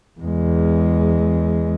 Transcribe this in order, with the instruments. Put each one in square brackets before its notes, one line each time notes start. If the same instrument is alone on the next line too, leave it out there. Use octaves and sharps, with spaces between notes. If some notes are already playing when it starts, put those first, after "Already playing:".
[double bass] E2 G#3